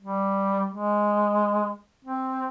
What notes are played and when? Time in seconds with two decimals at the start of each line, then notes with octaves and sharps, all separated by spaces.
0.02 G3
0.72 G#3
2.05 C4